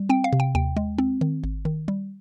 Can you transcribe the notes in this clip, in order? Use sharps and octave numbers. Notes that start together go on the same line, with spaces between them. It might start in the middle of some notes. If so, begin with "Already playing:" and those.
Already playing: G3
C4 G5
F5
C3
G5
D#2 G5
G#3
C4
D#3
G#1
D#3
G3